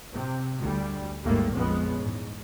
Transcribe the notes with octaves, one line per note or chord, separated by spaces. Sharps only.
C3
D2 G3
G#1 D#2 G3 A3 A#3
A#1 F2 F3 G#3 B3 C#4
E2 G#2